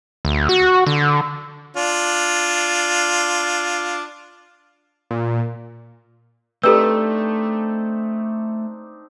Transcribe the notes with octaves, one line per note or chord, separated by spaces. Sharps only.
D2
F#4
D3
D4 F4
A#2
A3 C4 D4 D#4 G4 A4 B4 E6